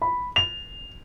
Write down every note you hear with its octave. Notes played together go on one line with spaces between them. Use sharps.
B5
F7